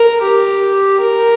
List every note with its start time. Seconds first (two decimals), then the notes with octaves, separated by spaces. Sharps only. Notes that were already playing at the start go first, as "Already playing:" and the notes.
Already playing: A#4
0.22 G4
1.01 A#4